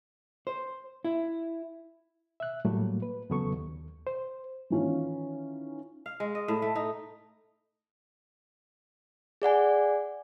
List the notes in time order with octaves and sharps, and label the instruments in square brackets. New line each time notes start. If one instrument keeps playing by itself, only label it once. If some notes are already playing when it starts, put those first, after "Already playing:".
[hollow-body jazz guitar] C5
E4
[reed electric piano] E5 F#6
A2 F#3 G3 A3 A#3
B4
E2 C#3 F#3 B3 A4 C#6
D#2
C5
[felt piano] D#3 E3 C#4 D#4 F4
[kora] F5
G#3
D#5
A2
A3
D#4
[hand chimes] G#4 D5 F#5 G#5